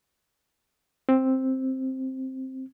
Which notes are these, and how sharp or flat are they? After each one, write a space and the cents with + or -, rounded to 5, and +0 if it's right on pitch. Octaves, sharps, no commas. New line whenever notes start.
C4 +5